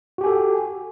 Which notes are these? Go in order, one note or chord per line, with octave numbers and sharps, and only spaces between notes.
F#4 G4 A4 G#5